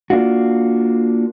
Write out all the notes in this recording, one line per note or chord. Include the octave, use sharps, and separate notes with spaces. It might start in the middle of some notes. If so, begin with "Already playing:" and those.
A#3 D4 F4 F#4